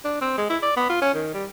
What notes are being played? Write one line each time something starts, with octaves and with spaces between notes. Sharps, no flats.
D4
C4
G#3
E4
D5
B3
F4
C#4
D#3
G3